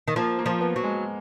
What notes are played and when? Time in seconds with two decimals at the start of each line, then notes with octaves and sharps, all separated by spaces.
0.08 D#3
0.16 F3 A#3
0.39 A#3
0.46 F3
0.61 B3
0.76 F#3
0.84 G#3